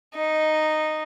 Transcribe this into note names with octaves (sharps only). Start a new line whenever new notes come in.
D#4